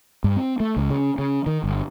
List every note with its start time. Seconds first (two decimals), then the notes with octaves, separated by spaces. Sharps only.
0.24 G2
0.36 C4
0.60 A3
0.77 C#2
0.90 C#3
1.18 C#3
1.46 D#3
1.64 G1